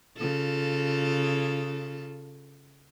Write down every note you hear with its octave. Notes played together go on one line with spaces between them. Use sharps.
C#3 F4 A4